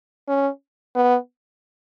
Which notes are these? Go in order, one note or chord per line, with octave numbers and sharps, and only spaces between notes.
C#4
B3